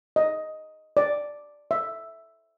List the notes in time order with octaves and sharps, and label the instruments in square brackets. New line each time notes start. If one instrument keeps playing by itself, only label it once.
[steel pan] D#5
D5
E5